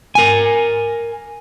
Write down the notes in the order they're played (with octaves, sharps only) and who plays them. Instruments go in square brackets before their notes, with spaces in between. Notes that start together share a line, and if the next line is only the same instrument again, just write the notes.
[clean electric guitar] A#4 G#5